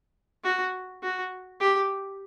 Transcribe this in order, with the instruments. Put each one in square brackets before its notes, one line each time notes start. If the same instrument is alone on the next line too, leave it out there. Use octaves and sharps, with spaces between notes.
[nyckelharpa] F#4
F#4
G4